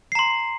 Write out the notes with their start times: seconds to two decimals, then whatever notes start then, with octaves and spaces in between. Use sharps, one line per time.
0.12 C7
0.15 A#5
0.19 C6